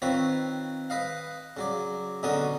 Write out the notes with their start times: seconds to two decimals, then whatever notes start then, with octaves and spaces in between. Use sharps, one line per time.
0.02 D#3 C4 F4 B4 C#5
0.90 B4 D#5 F5
1.57 C#3 F#3 D5
2.23 B2 D3 C#4 F#4 A#4 D#6